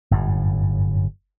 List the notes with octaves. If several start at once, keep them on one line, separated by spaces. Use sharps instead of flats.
G1 F#2 A2